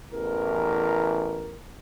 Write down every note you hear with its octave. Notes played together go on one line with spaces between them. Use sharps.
A1 E2 A#4